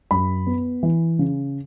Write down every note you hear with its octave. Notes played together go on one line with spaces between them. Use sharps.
F#2 B5
B3
E3
C#3